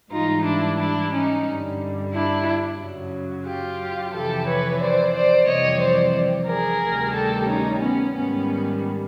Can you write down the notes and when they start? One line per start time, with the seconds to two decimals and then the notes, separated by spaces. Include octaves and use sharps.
0.11 G#2 E3 G3 D#4 F4
0.45 D4 E4
0.78 D4 E4
1.12 C#4 D#4
1.45 G2 D3 G3
2.12 D4 E4
2.79 F#2 C#3 F#3
3.46 F4 G4
4.13 F2 C3 E3 G4 A4
4.46 B4 C#5
4.79 C5 D5
5.13 C5 D5
5.47 F2 C3 E3 G3 C#5 D#5
5.80 C5 D5
6.47 G#4 A#4
6.81 D2 C3 D#3 G3
7.14 G4 A4
7.48 C#4 D#4
7.81 B3 C#4
8.14 G#2 D#3 G3 B3 C#4